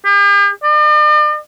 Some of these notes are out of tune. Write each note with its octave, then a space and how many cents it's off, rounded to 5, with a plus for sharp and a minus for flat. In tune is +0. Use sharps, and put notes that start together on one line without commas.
G4 +45
D5 +45